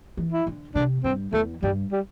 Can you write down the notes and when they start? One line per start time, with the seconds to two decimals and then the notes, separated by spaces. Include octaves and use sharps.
0.17 E3
0.32 E4
0.47 D3
0.75 C3 D4
1.04 G2 C4
1.32 E2 A3
1.62 G2 G3
1.92 G3